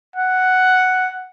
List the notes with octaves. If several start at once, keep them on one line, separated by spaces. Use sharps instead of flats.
F#5